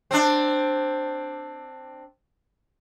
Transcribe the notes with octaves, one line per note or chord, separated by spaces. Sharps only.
C4 D4